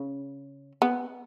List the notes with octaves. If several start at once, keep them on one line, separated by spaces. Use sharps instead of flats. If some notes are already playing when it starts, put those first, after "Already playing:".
Already playing: C#3
B3